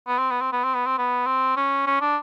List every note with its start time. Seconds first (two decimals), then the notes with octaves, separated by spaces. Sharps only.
0.07 B3
0.18 C4
0.30 B3
0.41 C4
0.52 B3
0.64 C4
0.74 B3
0.86 C4
0.98 B3
1.26 C4
1.56 C#4
1.87 C#4
2.01 D4